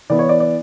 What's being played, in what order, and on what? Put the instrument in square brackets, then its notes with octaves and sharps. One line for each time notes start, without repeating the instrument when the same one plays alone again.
[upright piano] E3 B3 E4 D5
C#5
D5
D5